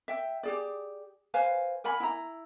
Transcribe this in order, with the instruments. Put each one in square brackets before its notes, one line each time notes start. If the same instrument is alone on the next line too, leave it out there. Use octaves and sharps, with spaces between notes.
[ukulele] E5 G5
G4 G#4 D5
B4 C5 F5 G#5
A#4 F#5 G#5 B5
E4 A#5